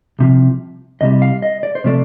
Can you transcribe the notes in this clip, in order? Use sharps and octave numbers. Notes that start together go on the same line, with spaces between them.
C2 C3 F3
C2 C3 G3 D#5
F5
D#5
D5
C5
C3 F3 A3 D5